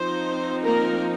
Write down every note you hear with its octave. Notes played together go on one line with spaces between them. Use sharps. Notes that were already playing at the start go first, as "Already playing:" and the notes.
Already playing: F3 C4 D#4 C5
A#3 A#4